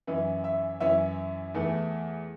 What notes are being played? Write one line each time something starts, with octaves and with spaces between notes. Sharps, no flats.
F#2 E3 C#4 E4
E5
F#2 E3 C#4 E4 E5
E2 E3 A3